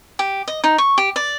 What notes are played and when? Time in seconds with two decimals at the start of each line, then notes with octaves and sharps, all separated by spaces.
0.19 G4
0.48 D#5
0.64 D#4
0.78 C#6
0.98 G4
1.16 D5